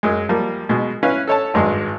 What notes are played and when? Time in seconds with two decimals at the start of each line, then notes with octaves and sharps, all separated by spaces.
0.03 F#2 G#3
0.29 F3 G3 A#3
0.69 B2 G#3
1.03 C#4 E4 B4 F5
1.27 A4 C#5 A5
1.54 G#1 G2 G#3